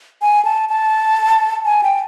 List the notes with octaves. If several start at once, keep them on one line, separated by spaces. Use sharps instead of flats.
G#5
A5
A5
G#5
G5